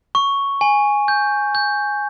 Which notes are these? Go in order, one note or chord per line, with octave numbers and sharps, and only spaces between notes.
C#6
G#5
G6
G6